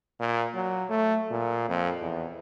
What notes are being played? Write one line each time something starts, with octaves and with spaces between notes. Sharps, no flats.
A#2
F#3
A3
A#2
F2
E2